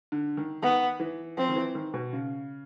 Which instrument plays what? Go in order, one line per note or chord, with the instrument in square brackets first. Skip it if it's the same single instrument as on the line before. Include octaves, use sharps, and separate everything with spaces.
[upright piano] D3
D#3
[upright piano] D#3 [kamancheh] B3
[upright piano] E3
[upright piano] F3 [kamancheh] C4
[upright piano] D#3
E3
D#3
B2
C#3